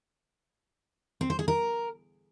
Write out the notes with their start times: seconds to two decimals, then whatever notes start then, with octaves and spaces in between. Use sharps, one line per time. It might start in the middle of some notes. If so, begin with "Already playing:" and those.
1.21 C4
1.30 C5
1.39 G#4
1.48 A#4